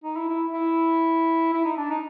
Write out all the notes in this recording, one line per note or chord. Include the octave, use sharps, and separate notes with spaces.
D#4
E4
E4
E4
E4
D#4
D4
D#4